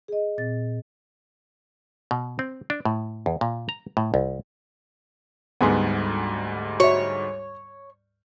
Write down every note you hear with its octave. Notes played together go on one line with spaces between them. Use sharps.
G#4 D#5
A#2 C4 A6
B2
C4
D4
A2
E2
A#2
A#5
A2
C2
D2 G#2 G3 B3 G#4 C6
F#4 C#5 E5